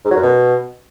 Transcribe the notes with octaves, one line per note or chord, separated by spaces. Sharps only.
G#2
F#3
F#2
B2